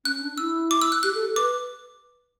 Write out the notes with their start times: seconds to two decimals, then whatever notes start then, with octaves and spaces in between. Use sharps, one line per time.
0.05 C#4 F#6
0.21 D4
0.38 E4 E6
0.71 D6
0.82 E6
0.92 F#6
1.03 G4 F#6
1.15 A4
1.36 B4 D6